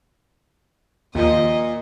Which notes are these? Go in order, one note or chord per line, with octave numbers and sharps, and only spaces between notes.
D#2 A#2 F3 D#5